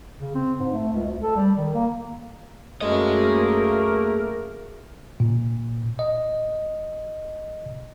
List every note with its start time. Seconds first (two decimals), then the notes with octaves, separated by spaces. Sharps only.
0.20 C#3
0.35 C4
0.59 G#2
0.72 A3
0.93 C#2
1.06 D2
1.22 A4
1.36 G3
1.57 D#3
1.74 A#3
2.81 F#2 A3 A#3 G#4 A#4 D#5
5.20 A#2
5.99 D#5